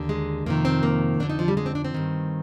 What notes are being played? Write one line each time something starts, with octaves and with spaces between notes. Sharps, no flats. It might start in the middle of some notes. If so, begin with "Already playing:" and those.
Already playing: D#2 D3
G#3
F2 C3 D#3 A#3
C4
A#3
F2 D3 D4
D#4
F3
G3
G#3
C4
D4
C4
G2 D#3